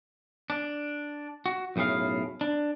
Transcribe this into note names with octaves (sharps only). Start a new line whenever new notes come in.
D4
F#4
B1 F#2 A2 G#4 F5
D4